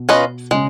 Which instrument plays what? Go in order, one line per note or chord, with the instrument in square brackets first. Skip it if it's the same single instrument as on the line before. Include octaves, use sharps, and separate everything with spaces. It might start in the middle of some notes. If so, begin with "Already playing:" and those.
Already playing: [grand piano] B2
[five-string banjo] C#4 F4 B4 D#5
[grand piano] C#3 [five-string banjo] G#3